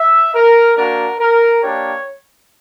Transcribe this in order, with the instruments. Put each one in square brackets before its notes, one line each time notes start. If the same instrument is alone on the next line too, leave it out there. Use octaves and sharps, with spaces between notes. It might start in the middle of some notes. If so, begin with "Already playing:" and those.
Already playing: [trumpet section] E5
A#4
A#3 D4 F#4 A#4
A#4
A#3 D4 G4 C#5